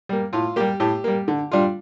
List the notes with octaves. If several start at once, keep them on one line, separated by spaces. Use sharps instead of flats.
G3 A#3
A2 F4
G3 A#3 G4
A2 G4
G3 A#3
D3
G3 D4 F4